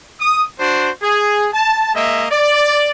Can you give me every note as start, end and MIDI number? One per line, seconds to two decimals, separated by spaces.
0.20 0.43 87
0.59 0.90 62
0.59 0.90 66
0.59 0.90 72
1.02 1.48 68
1.54 1.90 81
1.94 2.25 56
1.94 2.25 58
1.94 2.25 75
1.94 2.25 76
2.30 2.91 74